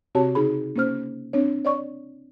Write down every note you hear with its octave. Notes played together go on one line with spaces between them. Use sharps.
C3 C4 F#4 G4 C#5 A5
C#3 D#4 G#4 B5
A#3 C#4 C5 F6
C4 D4 C#5
C#5 D5 C#6